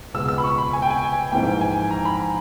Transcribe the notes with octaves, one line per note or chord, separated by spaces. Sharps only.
C#2 B2 G#3 E6
E6
B5
C#6
B5
G#5
G5
G#5
A#1 G#2 E3 A#3 G5
G#5
A#5
B5